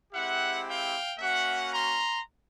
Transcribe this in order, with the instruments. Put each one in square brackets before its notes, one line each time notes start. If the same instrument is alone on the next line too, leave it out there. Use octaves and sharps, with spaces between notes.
[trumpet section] G#3 C4 E4 G4 E5 F#5
F5 G5
A#3 C#4 F#4 E5 F#5
A#5 C6